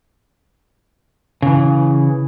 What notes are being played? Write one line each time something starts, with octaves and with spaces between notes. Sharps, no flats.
C#3 E3